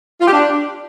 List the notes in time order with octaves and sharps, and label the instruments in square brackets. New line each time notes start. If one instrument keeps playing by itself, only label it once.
[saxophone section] F4
G4
D4